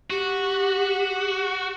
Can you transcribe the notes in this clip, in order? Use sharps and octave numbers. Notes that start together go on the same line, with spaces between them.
F#4 G4